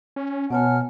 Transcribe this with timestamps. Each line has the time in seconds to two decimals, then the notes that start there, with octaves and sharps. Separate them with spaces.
0.16 C#4
0.50 B2 B3 C#5 F#5 G#5 A5 F6